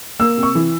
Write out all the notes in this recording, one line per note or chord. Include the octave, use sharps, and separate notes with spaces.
A#3 E6
C3
C#6
E3